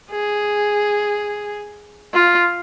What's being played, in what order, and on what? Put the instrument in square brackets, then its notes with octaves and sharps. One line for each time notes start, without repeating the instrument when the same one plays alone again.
[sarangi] G#4
F4